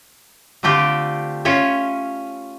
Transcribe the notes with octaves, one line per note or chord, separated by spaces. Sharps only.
D3 A3 C4 F4 G4
C#4 F4 C#5 E5